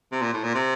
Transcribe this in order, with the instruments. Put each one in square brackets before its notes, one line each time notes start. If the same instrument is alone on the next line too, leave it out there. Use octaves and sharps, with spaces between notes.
[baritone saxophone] C3
A#2
A2
A#2
C3